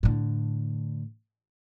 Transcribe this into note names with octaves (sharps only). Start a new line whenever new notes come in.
A2 D3